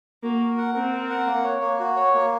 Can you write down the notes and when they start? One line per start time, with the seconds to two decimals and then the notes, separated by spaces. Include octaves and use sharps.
0.23 A#3 F#4
0.40 A#4
0.58 F#5
0.74 C4 A#4
0.93 A#4
1.10 F#5
1.27 A#3
1.44 C#5
1.61 A#3
1.79 F#4
1.96 C#5
2.14 A#3